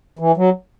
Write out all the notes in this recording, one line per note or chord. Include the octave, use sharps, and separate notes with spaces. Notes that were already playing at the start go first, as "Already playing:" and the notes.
E3
F#3